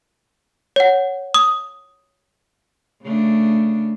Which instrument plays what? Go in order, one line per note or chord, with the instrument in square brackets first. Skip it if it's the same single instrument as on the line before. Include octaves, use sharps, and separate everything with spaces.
[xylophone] C#5 F#5
D#6
[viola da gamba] C#3 A3 D4